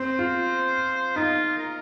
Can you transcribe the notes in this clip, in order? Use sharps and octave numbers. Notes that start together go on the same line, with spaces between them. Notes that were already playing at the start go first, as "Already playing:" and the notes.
Already playing: C4 C5
F4
D#4 F4
A#4